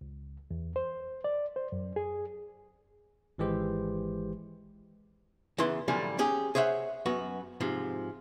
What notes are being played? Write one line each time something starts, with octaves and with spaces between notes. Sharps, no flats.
C#2
E2
C5
D5
C5
F#2
G#4
G#1 E3 G#3 G4 C5
E2 C#3 E4 B4 C6
F#2 A2 D3 F3 G3 G#5
C#4 G4 G#4
G#4 C5 C#5 E5 F#5
F#2 B3 F#4
G#2 C3 F3